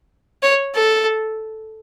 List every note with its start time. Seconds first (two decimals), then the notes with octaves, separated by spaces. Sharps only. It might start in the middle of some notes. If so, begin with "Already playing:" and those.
0.43 C#5
0.76 A4